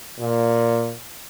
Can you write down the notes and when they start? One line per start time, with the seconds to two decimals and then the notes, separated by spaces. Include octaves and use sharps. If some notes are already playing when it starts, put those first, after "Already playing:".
0.19 A#2